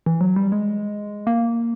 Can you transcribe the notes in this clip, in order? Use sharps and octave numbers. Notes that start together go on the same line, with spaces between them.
E3
F#3
G3
G#3
A#3